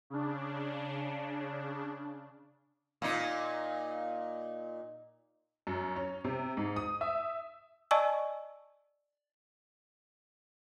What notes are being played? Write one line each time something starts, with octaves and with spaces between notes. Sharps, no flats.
C#3 D4
A#2 D#4
F#2
C#4
C3
G#2
D#6
E5
D5 D#5 G#5 A5 C#6 E6